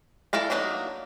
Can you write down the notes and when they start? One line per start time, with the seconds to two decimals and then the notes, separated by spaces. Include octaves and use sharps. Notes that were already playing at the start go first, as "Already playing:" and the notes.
0.33 E4 A4 D5 F5 A#5
0.50 F#3 A#3 B3 D4 D#4